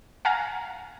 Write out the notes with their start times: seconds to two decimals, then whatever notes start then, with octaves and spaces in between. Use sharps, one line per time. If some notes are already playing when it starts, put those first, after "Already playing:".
0.25 F5 F#5 G#5 A#5